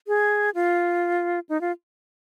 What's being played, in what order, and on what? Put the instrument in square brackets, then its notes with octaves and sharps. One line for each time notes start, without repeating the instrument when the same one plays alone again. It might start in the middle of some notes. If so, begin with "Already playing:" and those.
[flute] G#4
F4
D#4
F4